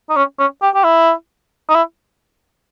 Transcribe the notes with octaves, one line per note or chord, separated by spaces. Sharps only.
D#4
C#4
C#4
G4
G4
E4
D#4
E4